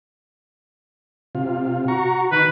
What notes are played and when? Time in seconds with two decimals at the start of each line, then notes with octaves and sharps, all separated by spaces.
1.35 C3 F4
1.88 F#4 A#5 C#6
2.32 D#3 B4